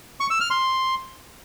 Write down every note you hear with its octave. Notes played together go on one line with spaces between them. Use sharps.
C#6
E6
F6
C6